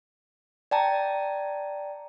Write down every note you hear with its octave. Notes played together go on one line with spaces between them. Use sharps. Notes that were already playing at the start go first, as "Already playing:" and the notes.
D5 G5 A5 A#5